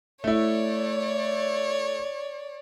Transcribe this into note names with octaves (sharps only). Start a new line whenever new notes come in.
A3 E4 C#5 D5